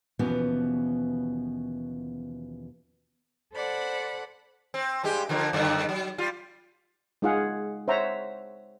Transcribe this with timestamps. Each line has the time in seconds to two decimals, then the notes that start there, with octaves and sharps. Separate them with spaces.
0.19 D#2 B2 E3 F3 B3 C#4
3.54 A4 C5 D5 F#5 B5
4.74 C4
5.04 G2 G#3 G4
5.29 D3 F3 A#3
5.53 F#2 D3 D#3
5.89 F#3
6.18 G3 F4
7.22 G#3 D#4 F4 G#4 F5 F#5
7.88 C5 C#5 E5 F#5 A#5